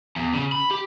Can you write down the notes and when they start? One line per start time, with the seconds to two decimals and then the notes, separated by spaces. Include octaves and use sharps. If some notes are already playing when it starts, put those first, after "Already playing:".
0.16 E2
0.34 C#3
0.52 B5
0.71 G4